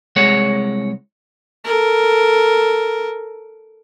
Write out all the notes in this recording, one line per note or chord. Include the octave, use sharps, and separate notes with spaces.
C2 G#3 C#5 F#5
A4 A#4